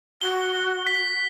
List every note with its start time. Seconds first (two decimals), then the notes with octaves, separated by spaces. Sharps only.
0.21 F#4 G7
0.87 B6